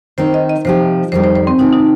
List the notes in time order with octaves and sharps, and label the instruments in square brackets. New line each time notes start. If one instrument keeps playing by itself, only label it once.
[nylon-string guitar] D#3 C4 D#4 [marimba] C5
[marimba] D#5
D#5
[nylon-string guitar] C3 F3 D#4 G4 [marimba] C5
[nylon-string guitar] F2 D#3 G3 [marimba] C5
[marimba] C5
C5
C4
[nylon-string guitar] C3 D#3 C4 [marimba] D#4
[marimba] D#4